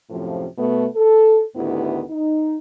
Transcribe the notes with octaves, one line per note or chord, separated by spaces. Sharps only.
F#2 A2 C3 F3
B2 A3 B3
A4
D2 A2 D#3 B3 E4 G4
D#4